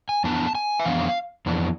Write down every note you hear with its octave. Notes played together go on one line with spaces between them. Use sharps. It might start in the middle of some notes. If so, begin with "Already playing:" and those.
G#5
F2 E3 B3 D4 A5
G#5
E5
F2 E3 B3 D4 F5
F2 E3 B3 D4